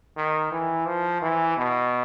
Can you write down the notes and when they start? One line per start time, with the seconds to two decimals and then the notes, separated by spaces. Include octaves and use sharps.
0.16 D#3
0.52 E3
0.86 F3
1.22 E3
1.57 B2